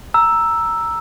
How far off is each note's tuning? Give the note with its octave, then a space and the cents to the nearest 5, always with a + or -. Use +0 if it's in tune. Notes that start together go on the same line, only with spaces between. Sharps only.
A#5 +0 E6 +0